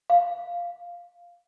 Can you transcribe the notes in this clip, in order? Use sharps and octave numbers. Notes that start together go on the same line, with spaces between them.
F5